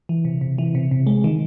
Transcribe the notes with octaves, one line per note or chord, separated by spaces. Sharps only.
E3
C3
C3
E3
C3
C3
G#3
D#3